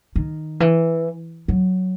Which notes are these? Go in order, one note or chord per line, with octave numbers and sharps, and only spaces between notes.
D#3
E3
F#3